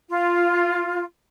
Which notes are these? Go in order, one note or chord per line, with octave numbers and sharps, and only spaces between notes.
F4